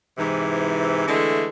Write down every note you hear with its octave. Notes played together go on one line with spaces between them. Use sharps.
G#2 C3 E3
D3 E3 G#3 A3 A4